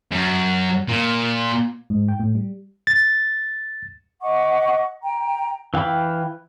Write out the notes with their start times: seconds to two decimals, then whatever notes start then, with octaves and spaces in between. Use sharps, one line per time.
0.12 F#2
0.88 A#2
1.90 G#2
2.08 G5
2.20 A2
2.35 G3
2.87 A6
4.21 D#5 F#5 C#6 D6
5.02 G5 A#5
5.74 E3 F5 G5 B5